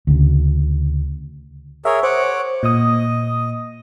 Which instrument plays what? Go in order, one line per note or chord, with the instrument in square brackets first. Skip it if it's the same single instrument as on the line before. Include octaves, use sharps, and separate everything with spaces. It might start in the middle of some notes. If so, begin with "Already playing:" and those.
[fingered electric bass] D2 C#3
[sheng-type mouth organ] G#4 A#4 C#5 [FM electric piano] E5
[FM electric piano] C5 [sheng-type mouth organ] C#5 F#5 D6
[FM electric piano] A#2 D#6 [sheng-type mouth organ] D#5